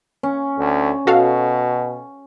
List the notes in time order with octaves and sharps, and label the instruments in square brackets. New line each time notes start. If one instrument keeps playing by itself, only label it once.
[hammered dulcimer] C#4
[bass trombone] D2
[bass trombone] B2 [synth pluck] F#4 A4 F5